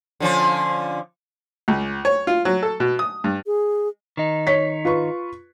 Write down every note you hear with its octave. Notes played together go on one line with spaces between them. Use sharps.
D3 F3 C#4
C#2
C#5
F4
F#3
A4
B2
D#6
G2
G#4
D#3 D#4
C#5 B6
F4 B4 C#6